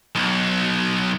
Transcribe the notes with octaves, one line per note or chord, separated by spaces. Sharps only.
B1